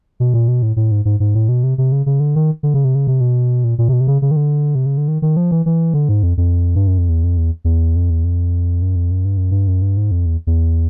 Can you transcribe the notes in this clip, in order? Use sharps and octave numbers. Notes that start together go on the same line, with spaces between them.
B2
A#2
B2
A2
A2
G#2
G#2
G#2
A2
B2
C3
C3
C#3
C#3
D3
D#3
D3
C#3
C3
C#3
C3
B2
A#2
A#2
C3
B2
C3
C#3
C#3
D#3
D3
C3
C#3
D3
D#3
D#3
F3
E3
E3
D3
G#2
F2
F2
G2
F#2
F2
E2
F2
E2
E2
F2
E2
F2
F#2
F2
F#2
G2
F#2
G2
F#2
G2
G#2
F2
E2
E2